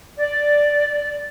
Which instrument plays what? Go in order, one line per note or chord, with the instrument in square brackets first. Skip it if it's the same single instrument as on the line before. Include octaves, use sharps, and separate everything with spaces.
[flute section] D5